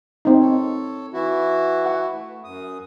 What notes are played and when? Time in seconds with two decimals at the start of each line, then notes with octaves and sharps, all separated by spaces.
0.25 C4 D#4
0.40 A4 C#5
1.13 E3 E4 F#4
1.86 F#5
2.13 A3
2.44 F#2 D#6